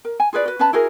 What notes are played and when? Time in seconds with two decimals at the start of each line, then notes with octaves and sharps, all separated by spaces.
0.05 A#4
0.20 G#5
0.33 F4 G#4 B4 D5
0.45 F#4 B4
0.59 C#4 B4 A5 B5
0.73 E4 F#4 G#4 A#4